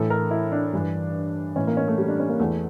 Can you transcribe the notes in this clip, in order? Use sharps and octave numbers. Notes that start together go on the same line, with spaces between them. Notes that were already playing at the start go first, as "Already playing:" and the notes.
Already playing: A2 E3 A4
A#4
E4
D4
G2 E3
A2 E3 C#4
A#3
C#4
A3
G3
D4
C#4
A#3
E2 E3 A3